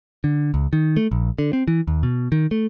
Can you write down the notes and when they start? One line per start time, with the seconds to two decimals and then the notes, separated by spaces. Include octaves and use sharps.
0.24 D3
0.54 C#2
0.73 D#3
0.97 A3
1.12 A#1
1.39 D3
1.53 C4
1.68 E3
1.87 D#2
2.03 B2
2.32 D#3
2.51 A3